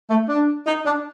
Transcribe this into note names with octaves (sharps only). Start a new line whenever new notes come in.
A3
D4
D#4
D4